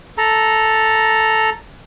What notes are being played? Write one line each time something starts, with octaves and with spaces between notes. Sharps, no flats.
A4 A#5